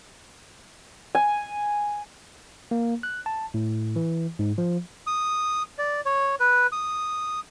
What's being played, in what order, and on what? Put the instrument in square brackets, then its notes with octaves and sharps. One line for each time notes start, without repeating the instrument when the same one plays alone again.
[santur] G#5
[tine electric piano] A#3
F#6
A5
A2
E3
G#2
F3
[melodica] D#6
D5
C#5
B4
D#6